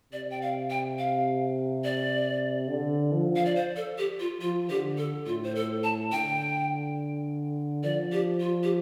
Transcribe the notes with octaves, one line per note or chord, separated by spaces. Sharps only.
C3 D5
G5
F5
G5
F5
D5
D3
F3
F5
D5
C5
A4
G4
F4
F3 F4
D3 G4
A4
A2 F4
C5
A4
A5
D3 G5
F3 D5
G4
F4
G4